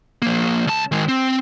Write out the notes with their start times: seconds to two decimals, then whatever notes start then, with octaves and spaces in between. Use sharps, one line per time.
0.22 F3 A#3
0.67 C#2 A5
0.92 D#3 G#3
1.08 C4